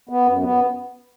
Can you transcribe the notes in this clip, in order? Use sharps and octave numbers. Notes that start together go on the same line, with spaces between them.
B3
F#2
B3